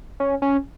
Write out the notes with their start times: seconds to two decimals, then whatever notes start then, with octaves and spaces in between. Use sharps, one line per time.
0.20 C#4
0.42 C#4